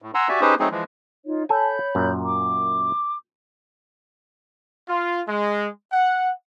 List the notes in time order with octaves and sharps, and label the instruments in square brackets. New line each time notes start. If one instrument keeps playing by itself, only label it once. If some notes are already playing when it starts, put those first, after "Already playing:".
[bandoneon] A2
F#5 G#5 A#5 C6 E6
F#4 G4 D5 E5 G#5
C#4 D#4 G4 G#4 B4 C5
F#3 A3 C4 D#4 G#4
E3 F3 G#3
[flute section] D#4 F4 C#5
[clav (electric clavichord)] A4 G#5 [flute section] C#5 B5 G6
[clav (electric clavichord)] F#2 A#2
[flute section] D6
[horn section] F4
G#3
F#5